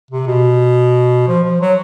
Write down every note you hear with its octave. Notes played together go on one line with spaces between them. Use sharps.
C3
B2
F3
F3
F#3